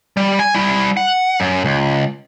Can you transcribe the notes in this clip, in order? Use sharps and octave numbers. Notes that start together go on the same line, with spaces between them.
G3
G#5
G3 E4
F#5
F#2
C#2